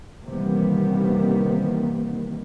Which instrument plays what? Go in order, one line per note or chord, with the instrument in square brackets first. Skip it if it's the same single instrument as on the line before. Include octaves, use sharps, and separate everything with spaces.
[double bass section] C3 D#3 E3 G3 A#3 B3